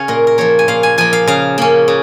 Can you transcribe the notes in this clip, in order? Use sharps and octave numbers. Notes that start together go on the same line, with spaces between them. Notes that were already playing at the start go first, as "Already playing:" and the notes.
Already playing: C#3 C#4 C#5 F5
A#2 A#4
A#4
F3 A#3 C#5
G#5
A#2 F5
G#5
F3 A#3 G#5
F5
C#3 F5
A#3 C#4
C#3